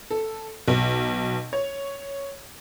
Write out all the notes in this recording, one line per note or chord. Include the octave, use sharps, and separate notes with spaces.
A4
B1
C#5